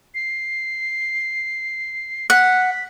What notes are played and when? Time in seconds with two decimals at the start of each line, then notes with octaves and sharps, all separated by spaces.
0.15 C7
2.30 F#5 B6